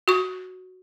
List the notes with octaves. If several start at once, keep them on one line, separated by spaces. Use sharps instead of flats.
F#4 C#6